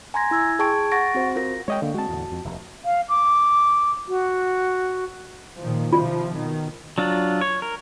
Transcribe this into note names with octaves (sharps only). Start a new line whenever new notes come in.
G#5 A#5 C6 G#6 A#6
E4 E6 G#6
G#4 G5 A5 C#6 G#6 D7
F#5 C#6 A6 A#6 D7
C4 F#4 C5
F4 A#4 A#6
G#3 C#5 D#5 G5
D3 A#3
G#3 C4 F#4 A5
E2 A2 D3
F2
F1 D#2
F5
D6
F#4
A#2 D#3 F3
C3 F3 F4
B2 D#3
F#3 D4 F4
C#5
A#4